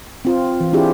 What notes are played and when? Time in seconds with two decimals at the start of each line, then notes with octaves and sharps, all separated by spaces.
0.25 C4 F4
0.60 E3
0.73 C4 D4 E4 F4 G4 G#4